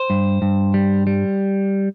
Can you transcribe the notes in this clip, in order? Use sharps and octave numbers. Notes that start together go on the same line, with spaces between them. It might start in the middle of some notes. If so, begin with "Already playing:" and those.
Already playing: C5
G2
G2
G3
G3